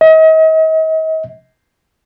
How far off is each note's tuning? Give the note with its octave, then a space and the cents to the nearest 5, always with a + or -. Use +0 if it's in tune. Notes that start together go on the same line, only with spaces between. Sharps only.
D#5 +40